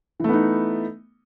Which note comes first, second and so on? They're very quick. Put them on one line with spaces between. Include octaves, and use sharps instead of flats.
E3 A3 B3 D#4